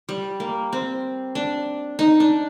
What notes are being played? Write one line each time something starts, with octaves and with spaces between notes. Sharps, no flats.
G3
A#3
C4
D4
D#4
D4